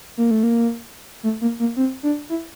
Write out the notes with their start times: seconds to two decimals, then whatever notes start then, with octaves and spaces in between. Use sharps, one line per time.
0.17 A#3
0.31 A3
0.43 A#3
1.23 A3
1.41 A#3
1.60 A#3
1.77 C4
2.03 D4
2.30 E4